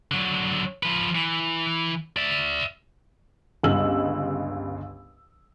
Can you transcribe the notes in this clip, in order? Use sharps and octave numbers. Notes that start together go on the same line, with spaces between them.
D3 F#3
F3 B4
E3
D5 E5
G1 C#2 G2 D#5 E6 F#7